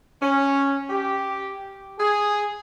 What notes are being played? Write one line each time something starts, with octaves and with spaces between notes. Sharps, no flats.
C#4
G4
G#4